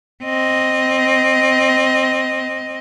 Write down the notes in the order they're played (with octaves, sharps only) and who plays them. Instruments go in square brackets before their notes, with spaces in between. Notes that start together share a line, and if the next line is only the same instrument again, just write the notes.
[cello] C4 D#5